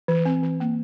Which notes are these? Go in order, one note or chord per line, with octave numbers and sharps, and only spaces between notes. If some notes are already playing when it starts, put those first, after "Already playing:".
E3
C4
E3
A#3